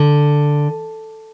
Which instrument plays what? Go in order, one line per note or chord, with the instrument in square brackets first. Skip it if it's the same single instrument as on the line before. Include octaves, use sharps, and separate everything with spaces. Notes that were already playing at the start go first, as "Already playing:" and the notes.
Already playing: [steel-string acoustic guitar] D3